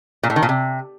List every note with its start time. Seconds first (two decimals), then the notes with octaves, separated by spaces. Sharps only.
0.23 A#2
0.30 A2
0.36 D#3
0.42 A#2
0.49 C3